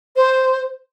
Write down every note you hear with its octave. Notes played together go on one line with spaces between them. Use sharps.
C5